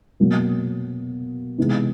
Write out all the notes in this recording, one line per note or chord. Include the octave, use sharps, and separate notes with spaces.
B2 F#3 A#3
C3 E3 G#3 B3 D#4